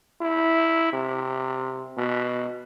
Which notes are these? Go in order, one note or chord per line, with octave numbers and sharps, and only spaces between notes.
E4
C3
B2